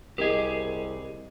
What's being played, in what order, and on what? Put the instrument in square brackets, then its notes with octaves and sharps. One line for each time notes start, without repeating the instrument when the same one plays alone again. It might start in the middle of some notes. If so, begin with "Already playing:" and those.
[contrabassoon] C2 [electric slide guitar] G4 G#4 [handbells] A#4 D#5